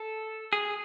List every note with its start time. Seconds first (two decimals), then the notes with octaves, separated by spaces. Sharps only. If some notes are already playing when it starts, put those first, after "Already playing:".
Already playing: A4
0.53 G#4